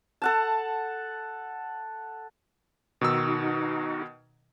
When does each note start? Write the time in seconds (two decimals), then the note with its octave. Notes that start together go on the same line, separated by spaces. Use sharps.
0.22 A4 F#5 A5
3.01 B2 D#3 D#4 F#4 E6